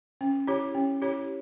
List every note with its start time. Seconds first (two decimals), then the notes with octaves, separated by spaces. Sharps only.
0.21 C#4
0.47 E4 G4 C#5
0.75 C#4
1.02 E4 G4 C#5